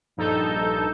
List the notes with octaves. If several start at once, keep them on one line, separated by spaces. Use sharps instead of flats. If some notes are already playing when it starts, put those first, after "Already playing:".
A#1 G2 D#4 A4 G6